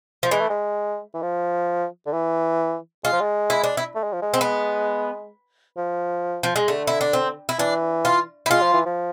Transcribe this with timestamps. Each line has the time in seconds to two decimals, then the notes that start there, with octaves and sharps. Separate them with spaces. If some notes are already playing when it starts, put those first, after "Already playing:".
0.23 F3
0.31 E3 G#3
0.41 A3
0.50 G#3
1.14 E3
1.22 F3
2.06 D3
2.13 E3
3.04 G#3 F4
3.13 F3
3.20 G#3
3.50 E4
3.64 D4
3.77 E4
3.95 A3
4.04 G#3
4.13 F3
4.22 G#3
4.34 C4
4.41 B3
5.77 F3
6.43 F3
6.56 G#3
6.68 D3 A3
6.87 E4
7.01 D4
7.13 C4
7.49 E4
7.59 E3 D4
8.05 F4
8.46 E4
8.50 G#3 F4
8.62 F3
8.74 E3
8.86 F3